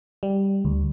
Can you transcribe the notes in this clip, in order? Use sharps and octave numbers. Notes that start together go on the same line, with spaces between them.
G3
D2